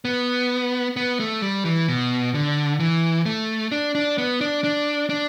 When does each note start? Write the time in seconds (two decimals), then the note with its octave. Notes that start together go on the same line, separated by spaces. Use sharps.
0.05 B3
0.96 B3
1.20 A3
1.42 G3
1.65 E3
1.88 B2
2.34 D3
2.80 E3
3.26 A3
3.72 D4
3.95 D4
4.18 B3
4.41 D4
4.64 D4
5.09 D4